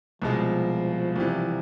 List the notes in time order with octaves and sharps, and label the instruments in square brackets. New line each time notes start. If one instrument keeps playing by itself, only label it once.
[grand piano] C2 B2 G#3 [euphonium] F3
[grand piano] C2 C3 E3